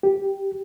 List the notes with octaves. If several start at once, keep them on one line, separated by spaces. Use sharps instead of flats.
G4